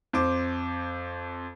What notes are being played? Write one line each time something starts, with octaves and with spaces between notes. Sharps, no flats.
F2 C5 D6